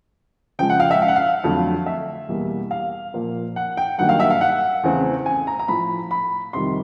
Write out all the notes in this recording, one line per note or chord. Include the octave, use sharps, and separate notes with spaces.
C#3 F3 G#3 G5
F#5
F5
E5
F5
F#5
F5
F2 D3 F#3 A3
E5
E2 B2 G3 A#3
F5
A#2 F3 A#3
F#5
G5
G2 D#3 F#3 A#3 F#5
F5
E5
F5
F#5
E2 C#3 E3 A3 C4
G#5
A#5
A#5
A2 F3 A3 B5
B5
F2 C3 D#3 G3 C6